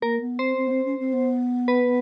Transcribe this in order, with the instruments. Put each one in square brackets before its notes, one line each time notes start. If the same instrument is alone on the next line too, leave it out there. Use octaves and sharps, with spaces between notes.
[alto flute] A#3 [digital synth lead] A#4
[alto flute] B3
[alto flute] C4 [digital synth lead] C5
[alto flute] C4
B3
C4
C#4
C4
B3
[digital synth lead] B4